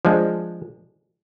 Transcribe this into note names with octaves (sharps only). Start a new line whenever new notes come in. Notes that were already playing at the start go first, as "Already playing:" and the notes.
F3 G#3 D4